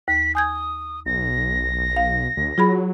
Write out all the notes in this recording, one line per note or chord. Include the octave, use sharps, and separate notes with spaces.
D#2 B6
G#5 D#6 G6 G#6
B1 A#6
F5
D2
F#3 F4 G#4 B5